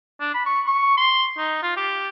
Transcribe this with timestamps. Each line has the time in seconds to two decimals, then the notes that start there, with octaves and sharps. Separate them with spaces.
0.20 D4
0.34 B5
0.46 C#6
0.66 C#6
0.97 C6
1.37 D#4
1.62 F4
1.76 G4